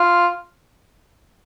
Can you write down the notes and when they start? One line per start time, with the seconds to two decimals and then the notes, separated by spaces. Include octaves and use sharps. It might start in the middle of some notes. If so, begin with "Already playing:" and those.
Already playing: F4